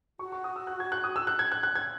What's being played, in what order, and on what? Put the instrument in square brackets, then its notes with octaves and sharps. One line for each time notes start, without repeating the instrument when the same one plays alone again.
[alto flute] F#4 [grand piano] C#6
[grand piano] C#6
D#6
E6
F#6
G#6
F#6
D#6
E6
F#6
G#6
F#6
F#6
G#6